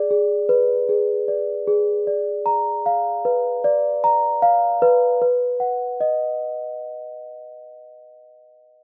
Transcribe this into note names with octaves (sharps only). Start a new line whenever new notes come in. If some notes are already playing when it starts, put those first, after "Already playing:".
Already playing: G#4 D5
G#4
B4
G#4
D5
G#4
D5
A#5
F5
B4
D5
A#5
F5
B4
B4
F#5
D#5